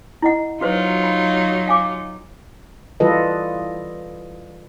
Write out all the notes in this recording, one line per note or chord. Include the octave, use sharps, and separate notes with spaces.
E4 D#5 F#5
F#3 D#4 F4 F#4 B4 C5
B5
F5 G#5 D6
E3 G3 F4 A4 B4 D#5